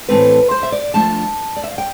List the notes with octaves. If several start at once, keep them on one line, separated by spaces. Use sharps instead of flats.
A2 E3 A3 C4 B4
C5
E5
D5
F3 A3 D4 F4 A5
D5
E5
F5
G5